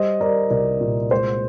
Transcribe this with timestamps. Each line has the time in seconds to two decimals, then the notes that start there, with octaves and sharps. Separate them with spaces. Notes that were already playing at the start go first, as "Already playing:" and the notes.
Already playing: G3 C5 D#5
0.21 G3 A#4 D5
0.50 C2 A#4 D5
0.81 A#2
1.11 G#3 C5